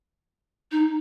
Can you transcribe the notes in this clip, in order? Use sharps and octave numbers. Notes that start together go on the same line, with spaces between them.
D#4